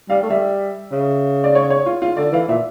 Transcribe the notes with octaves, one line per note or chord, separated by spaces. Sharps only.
G3 F5
A3
G3 E5
C#3
D5
C#5
C#5
F4
F4
D3 D5
E3 F5
A#2 E5